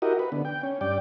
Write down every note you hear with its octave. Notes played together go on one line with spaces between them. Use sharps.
E4 F#4 G4 A#4 D#5
B4
D3 B3
G5
C#4
G2 D5 G5